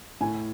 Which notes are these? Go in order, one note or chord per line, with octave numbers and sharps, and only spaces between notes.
A2 G#5